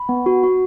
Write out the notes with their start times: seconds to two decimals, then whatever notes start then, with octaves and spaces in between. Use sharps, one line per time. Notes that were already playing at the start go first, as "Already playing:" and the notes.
Already playing: B5
0.09 B3
0.26 F#4
0.44 F#4